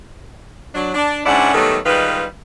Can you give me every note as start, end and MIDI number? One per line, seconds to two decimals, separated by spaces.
0.75 0.91 54
0.75 0.91 62
0.94 1.22 62
1.26 1.53 44
1.26 1.53 61
1.26 1.53 62
1.26 1.53 64
1.26 1.53 74
1.26 1.53 78
1.54 1.79 51
1.54 1.79 54
1.54 1.79 55
1.54 1.79 57
1.54 1.79 59
1.54 1.79 69
1.86 2.25 51
1.86 2.25 55
1.86 2.25 56
1.86 2.25 65
1.86 2.25 71